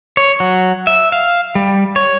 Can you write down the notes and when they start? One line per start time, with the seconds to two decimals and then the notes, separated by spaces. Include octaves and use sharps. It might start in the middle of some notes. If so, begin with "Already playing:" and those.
0.17 C#5
0.40 F#3
0.87 E5
1.12 F5
1.55 G3
1.96 C#5